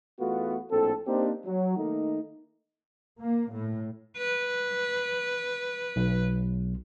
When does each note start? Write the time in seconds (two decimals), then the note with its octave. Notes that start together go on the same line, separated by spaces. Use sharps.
0.19 E2 A3 B3 F4 F#4
0.71 A#1 A2 C4 A4
1.06 A#3 C4 D4 D#4 G4 C5
1.46 F#3
1.77 D#3 A3 A#3 D#4
3.21 A#3
3.53 A2
4.17 B4
5.96 B1